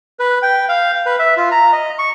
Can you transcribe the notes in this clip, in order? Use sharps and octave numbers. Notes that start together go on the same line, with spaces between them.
B4
G5
F5
B4
E5
F4
A#5
D#5
C#6